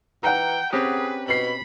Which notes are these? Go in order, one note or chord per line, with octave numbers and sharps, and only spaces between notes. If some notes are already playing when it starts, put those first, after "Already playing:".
E3 F#5 G5 A#5
C4 C#4 G4 G#4 B4
B2 B5 C7 F#7